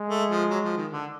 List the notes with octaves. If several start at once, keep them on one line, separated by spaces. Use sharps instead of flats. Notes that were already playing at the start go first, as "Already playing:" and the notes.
Already playing: G#3
A3
F3
F#3
F3
D#3
D3